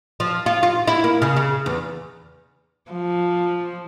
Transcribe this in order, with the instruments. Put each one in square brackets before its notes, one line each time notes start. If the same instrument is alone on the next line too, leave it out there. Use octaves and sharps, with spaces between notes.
[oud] F3
F4
F4
E4
A#3
C#3
C#3
E2
[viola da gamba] F3